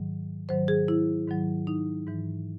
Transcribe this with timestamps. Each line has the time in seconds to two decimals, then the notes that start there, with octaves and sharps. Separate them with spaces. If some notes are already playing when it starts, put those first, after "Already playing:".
Already playing: G#2 D#3 F#3
0.49 G#2 D#3 F#3 C5
0.68 G#4
0.88 E4
1.28 G#2 D#3 F#3
1.67 D#4
2.07 G#2 E3